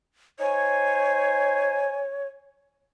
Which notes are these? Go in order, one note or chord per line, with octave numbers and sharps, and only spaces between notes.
D#4 C5 C#5 G#5